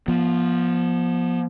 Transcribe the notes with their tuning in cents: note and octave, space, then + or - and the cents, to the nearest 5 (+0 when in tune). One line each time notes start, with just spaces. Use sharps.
F3 +0 B3 -35